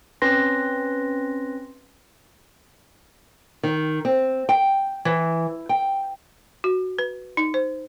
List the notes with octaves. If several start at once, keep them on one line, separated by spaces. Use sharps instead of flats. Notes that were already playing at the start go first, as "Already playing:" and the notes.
C4 C#4 B4 C6 A#6
D#3
C4
G5
E3
G5
F#4
B4
D#4
C5